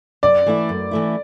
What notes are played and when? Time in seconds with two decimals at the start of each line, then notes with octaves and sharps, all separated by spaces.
0.23 F#2 D5
0.46 E3 A3 E4
0.69 F#2
0.91 E3 A3 E4